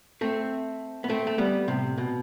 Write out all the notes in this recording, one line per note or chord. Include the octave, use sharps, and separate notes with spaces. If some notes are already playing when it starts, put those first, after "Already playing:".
A3 C4
B3
A3 C4
A3
G3 B3
A2 C3
B2